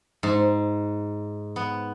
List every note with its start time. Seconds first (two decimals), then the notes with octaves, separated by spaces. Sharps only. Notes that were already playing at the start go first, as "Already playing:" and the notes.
0.23 G#2
1.56 B3